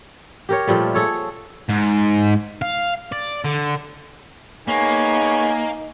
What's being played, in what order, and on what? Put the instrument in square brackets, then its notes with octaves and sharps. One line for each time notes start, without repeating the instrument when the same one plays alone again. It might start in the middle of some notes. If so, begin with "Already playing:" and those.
[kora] G4 A#4 C#5
A#2 F3 G3 A3
G#4 A4 C#5
[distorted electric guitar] G#2
F5
D5
D3
[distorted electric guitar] A#3 [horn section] B3 G#4 C#5 [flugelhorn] D#4 [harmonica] G#5